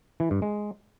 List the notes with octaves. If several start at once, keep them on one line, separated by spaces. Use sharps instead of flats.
E3
G2
G#3